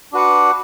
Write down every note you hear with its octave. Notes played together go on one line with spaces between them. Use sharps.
D4 F#4 B4 F#5